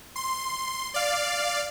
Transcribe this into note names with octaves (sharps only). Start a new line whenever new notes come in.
C6
D5 F5